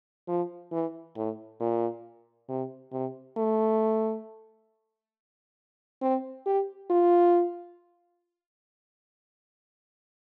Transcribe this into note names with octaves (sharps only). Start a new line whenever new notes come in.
F3
E3
A2
A#2
C3
C3
A3
C4
G4
F4